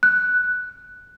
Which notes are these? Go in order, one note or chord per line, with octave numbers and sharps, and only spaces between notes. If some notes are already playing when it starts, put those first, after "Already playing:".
F#6